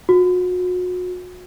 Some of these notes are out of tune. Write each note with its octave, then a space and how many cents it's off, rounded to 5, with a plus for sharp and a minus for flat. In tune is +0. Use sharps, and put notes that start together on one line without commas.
F#4 -35